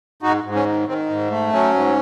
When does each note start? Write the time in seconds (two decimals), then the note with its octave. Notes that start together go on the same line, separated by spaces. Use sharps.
0.22 G#2 D#4 F#4
0.44 G#2
0.55 C#4
0.65 D#3
0.87 D#3 C4
1.09 G#2
1.30 A3
1.52 F#3 C#4
1.74 G#2